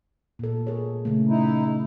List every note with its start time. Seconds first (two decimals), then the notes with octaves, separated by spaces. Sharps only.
0.39 A#2 A4
0.67 G#4 A#4 C#5
1.05 C#3 A3
1.29 D#4 E4